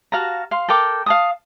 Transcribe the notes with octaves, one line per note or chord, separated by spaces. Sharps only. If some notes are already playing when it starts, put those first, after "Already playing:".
F#4 F5 A5 A#5
F5 C6
A4 A#4 G5 D6
F5 A5 D#6